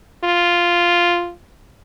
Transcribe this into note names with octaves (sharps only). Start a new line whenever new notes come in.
F4